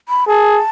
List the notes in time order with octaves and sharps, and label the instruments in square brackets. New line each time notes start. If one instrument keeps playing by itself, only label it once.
[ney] B5
[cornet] G#4 [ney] A5